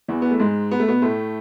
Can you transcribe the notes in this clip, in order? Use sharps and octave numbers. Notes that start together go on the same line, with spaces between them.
E2 E3
B3
A3
G#2 G#3
B3
A3
B2 B3
A2 A3